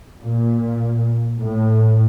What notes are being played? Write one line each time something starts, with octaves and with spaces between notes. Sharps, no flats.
A#2
A2